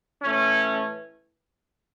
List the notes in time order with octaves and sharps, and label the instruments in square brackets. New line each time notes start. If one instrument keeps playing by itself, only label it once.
[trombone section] A2 E3 A3 C#4